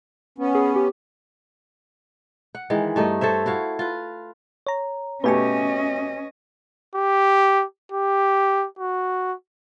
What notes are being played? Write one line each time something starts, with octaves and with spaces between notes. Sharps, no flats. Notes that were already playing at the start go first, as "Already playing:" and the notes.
B3 C#4
G#4
G4
F#5
D#3 E3 G#3
G2 A3 D#4 D#5
A4 C5 C#5 E5
E4 F#4 F5
F4 B4
C#5 A#5
B2 A3 C#4 G4 B4 D#5 G#5 C#6
G4
G4
F#4